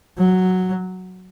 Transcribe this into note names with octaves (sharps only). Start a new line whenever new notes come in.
F#3